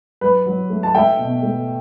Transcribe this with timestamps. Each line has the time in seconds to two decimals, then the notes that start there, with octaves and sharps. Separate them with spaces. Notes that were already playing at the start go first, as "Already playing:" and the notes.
0.21 F#3 B4
0.46 F#3
0.70 A3
0.83 A5
0.95 A3 E5 G5
1.18 B2
1.43 A3